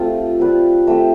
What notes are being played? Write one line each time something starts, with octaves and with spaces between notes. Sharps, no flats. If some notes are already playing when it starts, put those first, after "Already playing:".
Already playing: A3 C4 F4 G4
C4 G4 B4 D5
A3 C4 G4